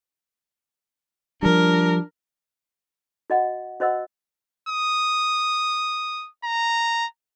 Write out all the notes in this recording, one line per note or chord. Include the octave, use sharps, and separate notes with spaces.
F3 G3 D4 A#4
F#4 D#5 F#5
F#4 C5 D#5 F#5 E6
D#6
A#5